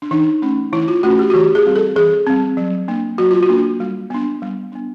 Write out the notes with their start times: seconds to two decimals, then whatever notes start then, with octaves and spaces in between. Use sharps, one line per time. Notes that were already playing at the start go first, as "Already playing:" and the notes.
0.02 D4
0.11 E3 D#4
0.42 A3 C#4
0.73 E3 E4
0.88 F4
1.03 A3 C#4 F#4
1.19 G4
1.30 F#4
1.34 E3 G4
1.55 G#4
1.65 G3 C4
1.75 A4
1.96 E3 G#4
2.27 G3 C4
2.57 F#3
2.88 A#3 D4
3.18 F#3 F#4
3.31 F4
3.43 F#4
3.49 A#3 D4
3.80 G3
4.10 B3 D4
4.42 G3
4.72 B3 D4